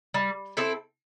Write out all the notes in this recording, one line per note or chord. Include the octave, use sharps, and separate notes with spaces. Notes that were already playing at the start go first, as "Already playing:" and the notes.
G3
C4 E4 A4